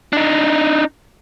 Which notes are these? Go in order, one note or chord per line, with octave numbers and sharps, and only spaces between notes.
D4 D#4